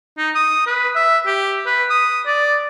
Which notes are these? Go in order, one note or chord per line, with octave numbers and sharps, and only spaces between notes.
D#4
D#6
B4
E5
G4
B4
D#6
D5